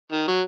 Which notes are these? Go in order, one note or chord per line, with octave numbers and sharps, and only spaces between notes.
D#3
F#3